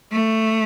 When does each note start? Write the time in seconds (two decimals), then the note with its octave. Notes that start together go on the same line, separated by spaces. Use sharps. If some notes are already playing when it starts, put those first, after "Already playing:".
0.12 A3